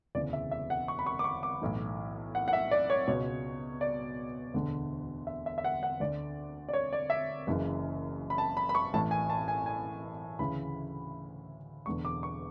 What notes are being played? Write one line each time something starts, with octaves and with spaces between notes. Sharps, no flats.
E1 D2 C#3 E3 D5
E5
E5
F#5
C#6
B5
C#6
D6
C#6
D6
B1 A2 E3
F#5
F#5
E5
D5
C#5
C#2 B2 C#5
D5
E1 D2 D3
E5
E5
E5
F#5
F#5
D2 D3 D5
D5
C#5
D5
E5
F#1 F#2 C#3 E3
B5
A5
B5
B5
C#6
A1 A2 E3 A5
G#5
A5
G#5
G#5
D2 C#3 E3 B5
E1 E2 D3 C#6
D6
C#6